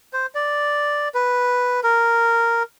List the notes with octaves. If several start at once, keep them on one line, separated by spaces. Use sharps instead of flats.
C5
D5
B4
A#4